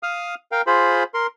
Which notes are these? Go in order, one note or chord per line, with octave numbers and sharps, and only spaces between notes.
F5 D#6 F6
A#4 F5 G5
F4 G#4 C5 B5
A#4 C6